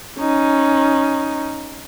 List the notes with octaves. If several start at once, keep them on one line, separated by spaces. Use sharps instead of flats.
C#4 D#4